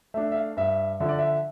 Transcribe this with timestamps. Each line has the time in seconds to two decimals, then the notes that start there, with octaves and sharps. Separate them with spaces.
0.14 A3 D4 E5
0.32 E5
0.36 F5
0.57 G2 E5
1.00 D3 F3 E5
1.09 D5
1.19 E5